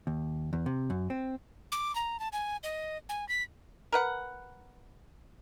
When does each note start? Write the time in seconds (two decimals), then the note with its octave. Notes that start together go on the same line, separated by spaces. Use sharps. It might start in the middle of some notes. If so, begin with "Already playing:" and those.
0.07 D#2
0.53 E2
0.66 C3
0.90 F#2
1.10 C4
1.72 D6
1.95 A#5
2.19 A5
2.32 G#5
2.63 D#5
3.09 G#5
3.29 B6
3.92 A#4 B4 F#5